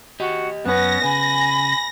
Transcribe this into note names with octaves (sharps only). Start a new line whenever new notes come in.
F#4 G4 D#5
F#2 B3 C#4 A#6
C#3 G#5 B5